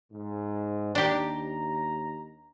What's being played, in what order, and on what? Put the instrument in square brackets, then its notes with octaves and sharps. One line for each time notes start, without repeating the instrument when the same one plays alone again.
[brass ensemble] G#2
[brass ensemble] D#2 A#5 [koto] D4 G4